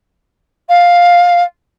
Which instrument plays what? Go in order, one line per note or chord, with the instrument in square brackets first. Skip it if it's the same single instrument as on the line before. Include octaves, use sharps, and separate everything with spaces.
[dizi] F5